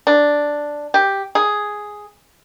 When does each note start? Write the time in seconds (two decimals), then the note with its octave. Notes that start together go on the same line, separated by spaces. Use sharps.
0.07 D4
0.94 G4
1.35 G#4